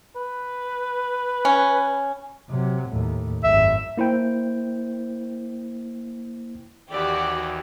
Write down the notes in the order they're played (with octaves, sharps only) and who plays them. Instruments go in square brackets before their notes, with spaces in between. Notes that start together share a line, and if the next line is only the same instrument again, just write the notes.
[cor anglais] B4
[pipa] C#4
[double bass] C3 F#3
D#2 A2
[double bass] G#1 F#2 [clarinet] E5
[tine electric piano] A#3 E4 C5 G5
[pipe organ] D#2 E3 [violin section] F#4 G4 [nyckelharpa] D5